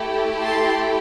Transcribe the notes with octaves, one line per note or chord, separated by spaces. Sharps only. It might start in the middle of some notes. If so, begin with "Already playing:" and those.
Already playing: A3 E4 G4
A5 C6